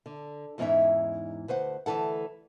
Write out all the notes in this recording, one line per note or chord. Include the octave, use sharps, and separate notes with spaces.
D3
E2 G#2 E3 C#4 D#4 E5
D2 B4 C5 F#5
D2 B2 E3 A4 F#5